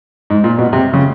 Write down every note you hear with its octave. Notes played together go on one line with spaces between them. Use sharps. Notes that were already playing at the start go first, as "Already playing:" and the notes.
G#2
A#2
B2
C3
C#3